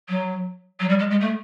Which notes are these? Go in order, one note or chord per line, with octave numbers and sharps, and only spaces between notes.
F#3
F#3
G3
G#3
G#3
A3